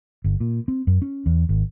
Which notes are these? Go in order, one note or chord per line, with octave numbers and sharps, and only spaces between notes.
G1
A#2
C4
F#2
C#4
E2
G#1